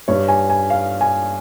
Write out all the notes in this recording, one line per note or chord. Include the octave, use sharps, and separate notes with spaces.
G2 G3 C#5
G#5
G#5
F5
G#5